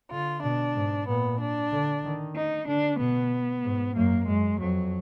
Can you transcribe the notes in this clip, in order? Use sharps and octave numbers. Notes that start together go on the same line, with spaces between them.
D3 F4
B2 D4
G#2
A#2 B3
D4
D3
D#3
D#4
D3 D4
B2 B3
G#2
F#2 A#3
F#2 G#3
F2 F#3